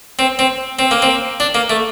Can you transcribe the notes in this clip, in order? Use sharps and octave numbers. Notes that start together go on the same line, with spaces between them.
C4
C4
C4
A#3
C4
D4
A#3
A3